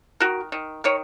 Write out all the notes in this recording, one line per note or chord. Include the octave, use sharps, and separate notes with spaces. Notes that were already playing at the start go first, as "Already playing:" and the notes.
D#3 F#4 A#4
D#3
D#3 A#4 C#5